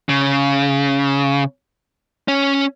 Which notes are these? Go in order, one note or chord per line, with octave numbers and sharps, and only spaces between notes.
C#3
C#4